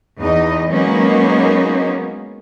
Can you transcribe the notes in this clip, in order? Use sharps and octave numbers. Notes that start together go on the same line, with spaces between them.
E2 D#4 D#5
F#3 G#3 A#3 B3 C#4 D#4